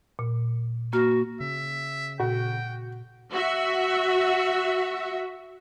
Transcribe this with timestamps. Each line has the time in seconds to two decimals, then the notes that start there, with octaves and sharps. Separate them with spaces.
0.19 A#2
0.93 A#3 F#4 F6
1.41 C#3 E5
2.20 A#2 F#4 G5
3.33 F#4 E5